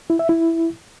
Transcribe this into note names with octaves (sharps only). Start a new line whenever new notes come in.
E4
E5
E4